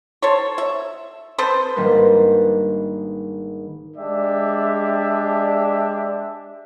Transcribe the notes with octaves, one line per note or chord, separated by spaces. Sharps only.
A4 C5 C#5
E5
C4 A4 B4 C5
G#1 D#3 G3 A#3 D4 B4
G#3 D4 G4 D5 E5